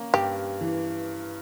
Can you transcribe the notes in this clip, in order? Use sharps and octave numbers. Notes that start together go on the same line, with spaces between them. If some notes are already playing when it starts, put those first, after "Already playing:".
Already playing: A#3 C#4
G2 G4
E3